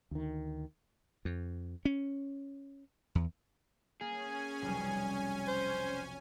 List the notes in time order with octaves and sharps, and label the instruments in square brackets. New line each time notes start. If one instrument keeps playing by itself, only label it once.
[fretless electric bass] D2 D#3
[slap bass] F2
C#4
E2
[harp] A#3 [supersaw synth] C#4 G#5 [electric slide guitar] G#4
[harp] F1 B1 G3
[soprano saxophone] C5